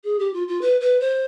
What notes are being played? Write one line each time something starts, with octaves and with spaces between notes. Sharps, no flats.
G#4
G4
F4
F4
B4
B4
C5